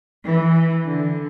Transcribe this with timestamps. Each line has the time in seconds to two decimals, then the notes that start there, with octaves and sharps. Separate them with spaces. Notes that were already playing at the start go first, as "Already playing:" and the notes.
0.25 E3
0.85 D3